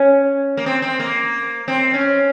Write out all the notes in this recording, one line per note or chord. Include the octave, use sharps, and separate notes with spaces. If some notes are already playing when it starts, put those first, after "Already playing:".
Already playing: C#4
A#3
C4
C4
A#3
C4
C#4